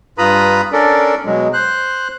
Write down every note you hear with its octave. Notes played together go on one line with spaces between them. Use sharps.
G2 F4 B4 A#5 B5 D#6
C#4 D4 A4 A#4 D5
B2 F#3 G#3
C5 F#6